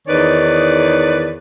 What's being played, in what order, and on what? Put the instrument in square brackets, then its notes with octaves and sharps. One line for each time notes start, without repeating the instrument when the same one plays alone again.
[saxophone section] E2 D#3 D#4 B4 C#5 D5